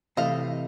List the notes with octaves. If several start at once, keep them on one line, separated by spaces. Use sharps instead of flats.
C3 E3 A3 D#5 F5